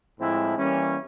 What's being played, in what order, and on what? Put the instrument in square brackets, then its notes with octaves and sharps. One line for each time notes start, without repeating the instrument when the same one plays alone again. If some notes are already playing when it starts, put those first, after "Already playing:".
[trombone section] A2 F3 G#3 C4 E4
E3 G3 A#3 C#4